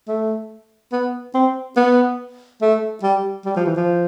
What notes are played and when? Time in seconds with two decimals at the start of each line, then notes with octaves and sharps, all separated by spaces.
0.08 A3
0.92 B3
1.34 C4
1.76 B3
2.62 A3
3.03 G3
3.45 G3
3.56 F3
3.66 E3
3.76 F3